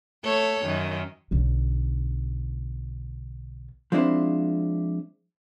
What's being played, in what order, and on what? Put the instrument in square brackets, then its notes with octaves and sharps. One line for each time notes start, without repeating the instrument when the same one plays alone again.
[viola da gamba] A3 A4 C#5
F#2 D#3
[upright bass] B1 D3
[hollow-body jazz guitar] F3 G#3 C4 D4 E4 C5